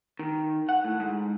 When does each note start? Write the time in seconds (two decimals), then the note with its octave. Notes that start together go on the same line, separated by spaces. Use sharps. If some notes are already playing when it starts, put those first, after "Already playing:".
0.19 D#3
0.69 F#5
0.85 A2
1.00 G#2